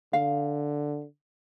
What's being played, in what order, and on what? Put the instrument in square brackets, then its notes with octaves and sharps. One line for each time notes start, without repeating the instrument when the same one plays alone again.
[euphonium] D3 [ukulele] F5